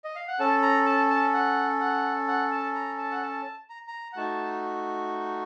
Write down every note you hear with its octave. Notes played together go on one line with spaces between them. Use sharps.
D#5
F5
F#5
C#4 A4 A5
A#5
A5
A5
F#5
F#5
F#5
A5
A#5
A5
F#5
A5
A#5
A#5
F#5
A3 D#4 F#4 A5